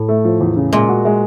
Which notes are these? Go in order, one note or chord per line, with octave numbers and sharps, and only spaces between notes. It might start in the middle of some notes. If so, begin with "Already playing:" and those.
Already playing: A2
A3
F3
E2
C#3
A#2 G#3
F#4
G#3